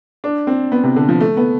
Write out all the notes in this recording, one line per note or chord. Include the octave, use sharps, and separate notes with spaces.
D4
C4
B3
C3
D3
F3
A3
B3